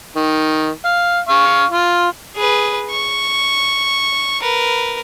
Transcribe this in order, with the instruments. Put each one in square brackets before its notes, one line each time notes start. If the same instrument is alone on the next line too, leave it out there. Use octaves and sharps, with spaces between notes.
[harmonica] D#3
F5
F5 C#6
F4
[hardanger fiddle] G#4 B4
C#6
A#4 B4